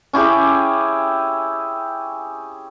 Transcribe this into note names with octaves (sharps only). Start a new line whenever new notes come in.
C#4 E4 G4 G#4